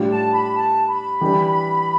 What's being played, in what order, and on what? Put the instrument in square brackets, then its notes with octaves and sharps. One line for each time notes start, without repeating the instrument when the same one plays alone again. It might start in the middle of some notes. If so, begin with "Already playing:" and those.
Already playing: [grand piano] A2 G3 D4 F4
[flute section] A5
B5
A5
B5
[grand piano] E3 G3 D4 G4